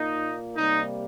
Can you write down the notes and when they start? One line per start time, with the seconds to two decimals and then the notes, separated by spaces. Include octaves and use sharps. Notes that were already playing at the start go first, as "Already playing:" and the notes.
Already playing: A#2 A#3 D#4
0.56 C3 G3 A#3 D#4